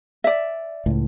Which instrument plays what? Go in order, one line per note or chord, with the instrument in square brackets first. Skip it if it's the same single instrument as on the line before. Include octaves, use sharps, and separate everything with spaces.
[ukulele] D5 E5
[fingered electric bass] C#2 A2